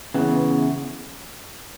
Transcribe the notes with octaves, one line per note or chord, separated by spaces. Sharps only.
C#3 E3 B3